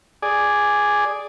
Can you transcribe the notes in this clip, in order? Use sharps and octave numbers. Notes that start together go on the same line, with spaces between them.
G#4 D5